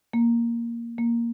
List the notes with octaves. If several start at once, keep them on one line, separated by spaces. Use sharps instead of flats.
A#3
A#3